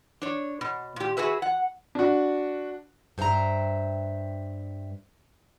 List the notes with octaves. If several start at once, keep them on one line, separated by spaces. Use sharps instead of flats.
D4 C#5
B2
A#2 G4
F#4 G#4 B4 E5
F#5
D4 F#4
G2 C5 E5 G5 A#5